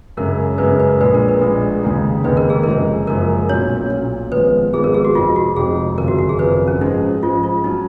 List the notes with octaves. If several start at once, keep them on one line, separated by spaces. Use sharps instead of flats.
F#2 C#3 G#3 C#4 A#4
F#2 C#3 G#3 C#4 B4
B4
A#1 A#2 G#3 B4
A#4
B4
A#1 A#2 G#3
F1 D#2 C#3 G#3 D#4
F1 D#2 C#3 G#3 D#4 B4
A#4
G#4
F#1 F#2 F3 G#3 D#4 A#4
F#1 F#2 F3 G#3 D#4 A#4
B1 A#2 F#3 C#4 C#5
B1 A#2 F#3 C#4
G#1 G#2 F3 G#3 B3 B4
G#1 G#2 F3 G#3 B3 G#4
A#4
G#4
F#4
F1 F2 F3 G#3 D#4 F4
F#4
F1 F2 F3 G#3 D#4 G#4
G#1 F#2 C#3 F3 A#4
F#4
F#4
G#4
G#1 F#2 C#3 F3 B4
C#4
G#2 F3 G#3 D#4
G#2 F3 G#3 F4
F4
F#3 C#4 D#4